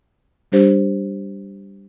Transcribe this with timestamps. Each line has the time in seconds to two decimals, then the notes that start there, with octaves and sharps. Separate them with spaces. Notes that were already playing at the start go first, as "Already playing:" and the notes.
0.52 G3 D4 G4 C5